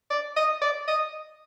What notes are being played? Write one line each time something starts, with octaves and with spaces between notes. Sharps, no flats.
D5
D#5
D5
D#5